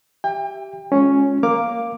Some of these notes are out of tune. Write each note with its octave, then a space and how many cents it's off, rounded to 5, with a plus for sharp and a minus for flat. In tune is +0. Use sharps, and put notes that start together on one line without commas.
G4 -15 E5 +10 G5 +35
G#3 +0 C#4 +0 F4 +35
A#3 +0 F5 +0 D6 +0